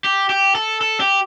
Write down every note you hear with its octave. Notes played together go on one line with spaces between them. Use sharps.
G4
G4
A4
A4
G4